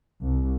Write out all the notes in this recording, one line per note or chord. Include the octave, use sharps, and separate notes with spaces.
C2